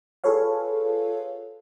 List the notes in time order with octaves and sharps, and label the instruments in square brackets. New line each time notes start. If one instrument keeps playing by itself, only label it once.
[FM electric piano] F4 G#4 A4 B4 C#5 F5